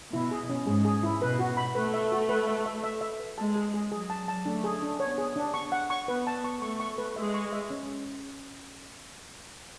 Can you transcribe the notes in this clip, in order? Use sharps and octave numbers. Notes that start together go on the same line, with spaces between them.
B2 E4
G#4
C#4
G#2 G#4
G#4
E4
B2 B4
F#4
B5
A3 B4
E5
F#4
B4
E5
E5
E5
E5
B4
G#3 A5
G#4
G#4
F#3 G#4
A5
A5
A3 D4
G#4
D4
B3 C#5
G#4
D4
C#6
F#5
C#6
B3 B4
A5
C#6
A3 C#6
C#6
B4
G#3 E5
C#6
E5
C#4